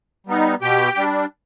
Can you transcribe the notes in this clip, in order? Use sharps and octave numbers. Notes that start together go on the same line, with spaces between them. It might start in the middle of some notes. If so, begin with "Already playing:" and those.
G3 B3 D#4
B2 G4 G5
G3 D4